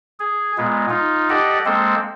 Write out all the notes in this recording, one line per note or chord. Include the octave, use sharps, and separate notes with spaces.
G#4
A#2 G#3 B3
D#4 F4
G4 A4 D5 D#5 F#5
G#3 A#3 C4 A4 C5